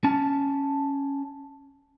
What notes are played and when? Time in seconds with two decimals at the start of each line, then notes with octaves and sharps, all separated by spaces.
0.04 C#4 A5